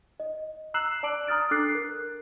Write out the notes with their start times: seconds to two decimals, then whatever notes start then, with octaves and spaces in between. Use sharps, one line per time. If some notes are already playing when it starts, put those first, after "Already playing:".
0.20 D#5
0.74 A#5 E6 F#6 C7 E7 F#7
1.03 D5 A5 D6 D7 F#7
1.27 A#5 D#6 F6 A6 D7
1.51 D4 A4 D6 F#6 A6 C7
1.75 A#4